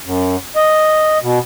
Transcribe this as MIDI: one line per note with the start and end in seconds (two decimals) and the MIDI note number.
0.05 0.36 42
0.56 1.18 75
1.22 1.39 47